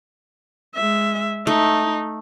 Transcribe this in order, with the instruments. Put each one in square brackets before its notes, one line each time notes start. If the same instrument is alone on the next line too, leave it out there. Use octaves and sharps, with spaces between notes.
[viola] G#3 E5
[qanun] A3 [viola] D#4